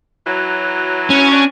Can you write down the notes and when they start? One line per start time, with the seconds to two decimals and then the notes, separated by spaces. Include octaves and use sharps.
0.26 E3 F#3
1.10 C#4
1.32 D4 E4 F#4